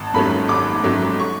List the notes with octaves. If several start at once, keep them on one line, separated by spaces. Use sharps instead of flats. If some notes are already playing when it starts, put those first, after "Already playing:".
Already playing: G#1 A5
G#2 F#3 A3 C#4 B5
G#1 D6
G#2 F#3 A3 C#4
C#6